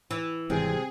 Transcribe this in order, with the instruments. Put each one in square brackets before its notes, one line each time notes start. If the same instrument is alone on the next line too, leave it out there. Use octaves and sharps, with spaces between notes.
[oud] E3
[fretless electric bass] G#1 E3 G3 [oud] C3 [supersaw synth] G#4